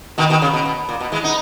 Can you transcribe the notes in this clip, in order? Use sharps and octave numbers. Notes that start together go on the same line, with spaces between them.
B2 D#3
B2 D#3
C#3
B2
B2
A#2
B2
E3 G#3
B3 D#4